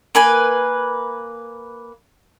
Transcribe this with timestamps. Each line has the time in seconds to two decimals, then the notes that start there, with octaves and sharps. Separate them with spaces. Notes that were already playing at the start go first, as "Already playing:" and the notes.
0.15 A#3 B4 G#5